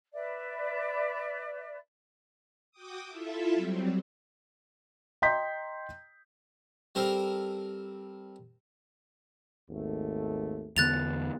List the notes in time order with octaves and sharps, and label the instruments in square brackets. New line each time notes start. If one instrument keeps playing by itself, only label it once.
[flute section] B4 D5 E5
[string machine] F#4 G5 D6 D#6
E4 F4 A4 E5
F#3 G3 C4
[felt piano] D#5 G5 A#5 C6 G6 B6
[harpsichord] G3 C4 A4 A#4 C5
[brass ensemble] G#1 D#2 A3
[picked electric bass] E2 D3 B3 [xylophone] F#6 A6 F7